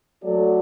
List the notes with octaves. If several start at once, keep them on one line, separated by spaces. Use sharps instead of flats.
F#3 A3 F#4 A4 D5